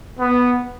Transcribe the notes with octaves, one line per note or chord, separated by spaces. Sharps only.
B3